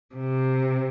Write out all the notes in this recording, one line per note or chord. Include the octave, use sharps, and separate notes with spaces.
C3